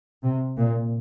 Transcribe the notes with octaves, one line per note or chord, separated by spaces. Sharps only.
C3
A#2